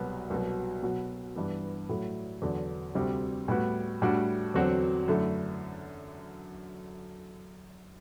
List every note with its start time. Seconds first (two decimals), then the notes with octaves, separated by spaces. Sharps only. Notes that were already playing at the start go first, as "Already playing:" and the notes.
Already playing: C2 B2 F#3 B3
0.30 C2 B2 F#3
0.83 B2 F#3 B3 F#4
1.36 G2 E3 B3
1.89 A2 F#3 A3 E4
2.42 E2 D3 F#3
2.95 D2 C3 G3 C4 F#4
3.48 A2 G3 B3 F#4
4.02 A2 G3 D4 F#4
4.54 E2 D3 F#3 C4 F#4
5.08 F#2 D3 A3 E4